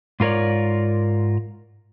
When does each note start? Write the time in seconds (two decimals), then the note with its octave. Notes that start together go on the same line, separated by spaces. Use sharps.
0.20 G#2 F4 A#4 C#5 D5